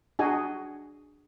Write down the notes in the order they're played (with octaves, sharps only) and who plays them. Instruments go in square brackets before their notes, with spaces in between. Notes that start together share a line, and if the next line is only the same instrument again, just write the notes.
[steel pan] D4 F#4 G#4 D#5 G#5